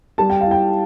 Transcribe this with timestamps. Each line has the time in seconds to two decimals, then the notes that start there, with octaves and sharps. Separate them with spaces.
0.18 G3 A5
0.30 G5
0.41 F5
0.46 E4 G5